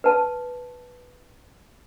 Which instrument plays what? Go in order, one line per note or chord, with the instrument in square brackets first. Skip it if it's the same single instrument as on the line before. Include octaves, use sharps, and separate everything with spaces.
[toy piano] B4 A5